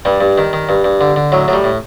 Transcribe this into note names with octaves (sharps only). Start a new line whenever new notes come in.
G2 G3
G2
D#3
D#3
G2
G2
D3
D3
A2 F#3
A2 F#3
G3
A2